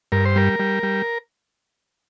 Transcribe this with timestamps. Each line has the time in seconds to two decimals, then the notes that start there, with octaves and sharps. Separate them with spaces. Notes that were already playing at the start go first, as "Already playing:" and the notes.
0.12 G2 A#4
0.25 C5
0.36 G3 A#4
0.59 G3
0.83 G3